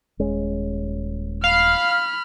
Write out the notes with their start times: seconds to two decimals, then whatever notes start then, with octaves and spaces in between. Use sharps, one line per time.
0.19 D#1 G#3 C#4
1.44 F5 B5 F6